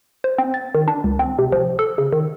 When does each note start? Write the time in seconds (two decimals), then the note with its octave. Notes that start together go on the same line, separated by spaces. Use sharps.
0.24 C5
0.38 C4
0.54 A6
0.75 D#3
0.88 D4
1.04 C#2
1.19 C4
1.39 C3
1.52 F3
1.79 A4
1.98 C#3
2.13 D#3